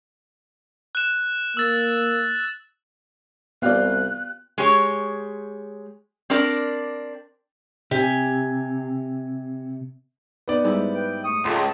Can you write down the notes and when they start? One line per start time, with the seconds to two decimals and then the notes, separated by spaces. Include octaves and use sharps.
0.95 F#6 E7
1.57 A#3 E6 A6
3.62 C2 B3 F4 G4 D5 F5 F#6
4.58 G#3 G4 C#5
6.30 C4 D4 A#4 D5
7.91 C3 G4 G#5
10.48 B3 D#4 D5
10.64 G#2 G3 E4
10.94 B4 G5
11.24 A3 C#6 D#6
11.45 C#2 A4 A5 C6